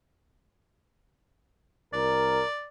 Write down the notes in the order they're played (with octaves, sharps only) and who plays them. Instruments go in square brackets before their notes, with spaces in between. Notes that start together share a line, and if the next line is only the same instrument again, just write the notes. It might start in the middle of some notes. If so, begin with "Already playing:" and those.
[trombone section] C2 A#4 [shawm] D5